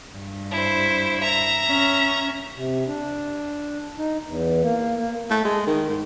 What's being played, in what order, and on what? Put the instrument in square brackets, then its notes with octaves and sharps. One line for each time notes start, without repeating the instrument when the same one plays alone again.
[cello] G2
[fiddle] E4 C5
E5 A#5
[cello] C#4
[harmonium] C3
D4
D#4
E2
A#3
A#3
[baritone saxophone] A3
G#3
D#3
G#2